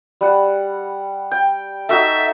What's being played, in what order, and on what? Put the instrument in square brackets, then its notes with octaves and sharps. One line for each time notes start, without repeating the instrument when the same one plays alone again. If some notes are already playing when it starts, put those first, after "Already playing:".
[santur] G3 F#5
G5
[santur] D#4 F#4 A4 [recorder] E5